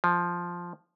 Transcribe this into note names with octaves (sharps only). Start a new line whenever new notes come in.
F3